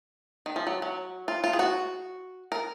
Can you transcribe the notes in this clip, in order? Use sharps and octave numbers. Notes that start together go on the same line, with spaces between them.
D#3
F3
F#3
F#3
F4
F4
G#4
F#4
A#4